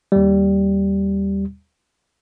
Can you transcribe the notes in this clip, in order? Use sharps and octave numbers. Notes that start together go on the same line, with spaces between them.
D#2 G3